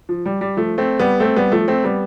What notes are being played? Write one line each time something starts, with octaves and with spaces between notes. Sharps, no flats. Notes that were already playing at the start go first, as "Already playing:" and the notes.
F3
G3
G3
F3 A3
A3 C4
G3 B3
A3 C4
G3 B3
F3 A3
A3 C4
G3 B3